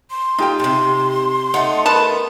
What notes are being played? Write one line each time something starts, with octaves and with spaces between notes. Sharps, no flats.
C6
D#4 F4 G4 G5
A2 C3 C6
A3 D#4 F#5
B3 A#4 A5